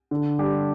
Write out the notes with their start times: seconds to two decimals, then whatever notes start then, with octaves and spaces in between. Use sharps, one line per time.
0.11 D3
0.39 G3 D4 G4